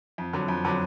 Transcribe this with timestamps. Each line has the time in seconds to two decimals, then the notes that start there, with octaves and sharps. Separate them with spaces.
0.18 F2
0.33 D3 F#3
0.48 F2
0.65 D3 F#3